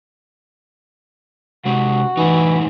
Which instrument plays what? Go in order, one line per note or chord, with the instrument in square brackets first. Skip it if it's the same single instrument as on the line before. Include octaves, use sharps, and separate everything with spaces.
[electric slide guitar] C3 G#3 G4 [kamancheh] F#4
[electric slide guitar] A2 D#4 [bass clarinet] E3